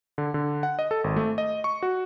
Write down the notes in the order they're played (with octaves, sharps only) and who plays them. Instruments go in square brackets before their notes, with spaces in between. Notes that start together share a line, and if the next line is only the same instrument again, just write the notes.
[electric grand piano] D3
D3
F#5
D#5
A4
G#1
A3
D#5
C#6
F#4